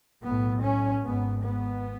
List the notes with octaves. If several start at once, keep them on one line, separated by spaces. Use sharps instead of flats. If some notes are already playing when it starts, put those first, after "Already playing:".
B1 A2 B3
C#4
G#1 G#2 B3
B3